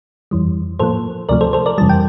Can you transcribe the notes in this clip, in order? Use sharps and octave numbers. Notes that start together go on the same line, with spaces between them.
F2 E3 G3
A2 F3 A#3 A4 C5
D2 C3 F3 A3 A#4 D5
A4 C5
A4 C5
A#4 D5
F2 C3 E3 G3 A5
G5